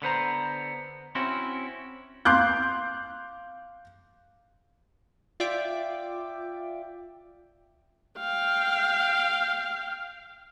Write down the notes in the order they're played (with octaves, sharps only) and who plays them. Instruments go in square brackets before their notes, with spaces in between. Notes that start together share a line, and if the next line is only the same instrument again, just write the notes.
[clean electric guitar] D3 B3 C5 A#5
C4 C#4 E4 F#4
[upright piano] F5 C6 D6 F#6 G6
[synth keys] F4 D5 E5 G5 D6
[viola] F5 G5